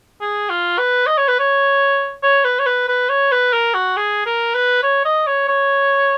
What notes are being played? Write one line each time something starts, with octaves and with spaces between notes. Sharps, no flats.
G#4
F4
B4
D#5
C#5
B4
C#5
C#5
B4
C#5
B4
B4
C#5
B4
A#4
F#4
G#4
A#4
B4
C#5
D#5
C#5
C#5